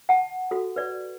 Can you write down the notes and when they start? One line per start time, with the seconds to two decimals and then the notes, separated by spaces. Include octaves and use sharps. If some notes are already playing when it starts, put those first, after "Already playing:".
0.09 F#5 A5
0.51 F#4 A4
0.76 B4 D5